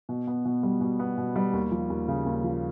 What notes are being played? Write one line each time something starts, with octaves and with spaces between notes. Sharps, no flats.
B2
B3
B2
G3
B2
B3
B2
G3
D#2
F3
D#2
C#3
D#2
F3